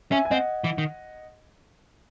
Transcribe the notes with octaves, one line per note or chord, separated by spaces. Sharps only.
C#4 E5 G#5
G#5
C4 D#5 F#5
E3
D#3